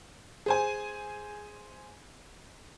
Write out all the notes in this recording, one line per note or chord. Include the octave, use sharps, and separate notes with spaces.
G#4 C5 G#5